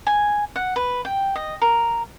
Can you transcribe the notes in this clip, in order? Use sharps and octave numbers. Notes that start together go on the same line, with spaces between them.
G#5
F#5
B4
G5
D#5
A#4